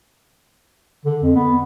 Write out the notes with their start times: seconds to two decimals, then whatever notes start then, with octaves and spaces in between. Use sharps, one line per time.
1.05 D3
1.23 F2
1.35 B3